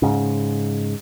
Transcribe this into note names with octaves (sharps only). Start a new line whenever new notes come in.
G#2 C#3